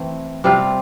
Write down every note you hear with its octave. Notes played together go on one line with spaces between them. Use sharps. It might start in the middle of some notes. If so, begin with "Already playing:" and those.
Already playing: E3 A3 C4
C3 G3 C4 F4